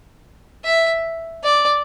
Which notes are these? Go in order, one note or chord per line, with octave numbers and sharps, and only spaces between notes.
E5
D5